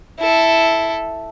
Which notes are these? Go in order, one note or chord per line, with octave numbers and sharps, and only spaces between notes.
E4 A4